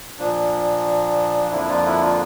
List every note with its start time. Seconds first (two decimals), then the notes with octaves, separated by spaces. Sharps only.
0.19 A#2 F3 A#3 D4
1.51 F2 D3 F3 A#3 E4
1.68 D4 F4
1.85 E4
2.01 D4 F4